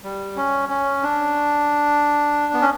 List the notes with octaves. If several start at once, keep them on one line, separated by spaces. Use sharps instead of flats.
G3
C#4
C#4
D4
B3
C#4